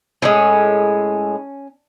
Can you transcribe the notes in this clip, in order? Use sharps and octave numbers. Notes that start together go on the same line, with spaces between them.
A2 E3 G#3 C#4